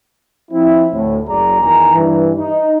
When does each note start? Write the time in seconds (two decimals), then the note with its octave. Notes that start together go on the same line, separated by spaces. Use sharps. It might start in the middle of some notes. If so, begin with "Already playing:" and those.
0.51 F3 C4 E4
0.93 D2 A2
1.28 F#1 F#2 F#3 G#4 D5 A#5
1.62 E2 D#3 G#5 A#5
1.93 G2 E3
2.38 D#4